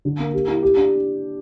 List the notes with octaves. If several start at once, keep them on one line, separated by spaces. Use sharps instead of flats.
D3
A#3
G4
E4
G4
D4